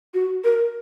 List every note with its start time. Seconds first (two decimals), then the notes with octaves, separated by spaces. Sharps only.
0.14 F#4
0.44 A#4